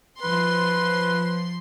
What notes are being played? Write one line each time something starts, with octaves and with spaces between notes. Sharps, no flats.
F3 B4 C6